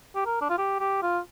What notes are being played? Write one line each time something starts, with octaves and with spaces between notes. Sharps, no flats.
G4
A#4
D4
F4
G4
G4
F4